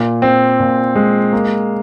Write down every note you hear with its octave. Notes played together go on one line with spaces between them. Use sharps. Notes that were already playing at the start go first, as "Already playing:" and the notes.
Already playing: A#2
C4
A#2
G#3
A#3